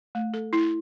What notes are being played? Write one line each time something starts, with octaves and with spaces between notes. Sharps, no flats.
A3
A4
E4